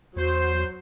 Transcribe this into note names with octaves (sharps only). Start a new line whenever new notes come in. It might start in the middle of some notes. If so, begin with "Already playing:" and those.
E2 F#3 C5